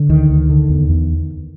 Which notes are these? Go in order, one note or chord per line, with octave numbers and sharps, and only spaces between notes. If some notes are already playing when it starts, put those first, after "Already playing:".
Already playing: D3
D2 D#3
D2
D3
E2
E2